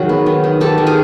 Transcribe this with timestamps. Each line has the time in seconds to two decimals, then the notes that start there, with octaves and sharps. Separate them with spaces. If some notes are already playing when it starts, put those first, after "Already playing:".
Already playing: D#3 F#3 F#4 G#4
0.09 B3
0.26 D#3
0.44 D#3
0.60 D#3 G4 A4
0.78 D#3
0.87 G#4 A#4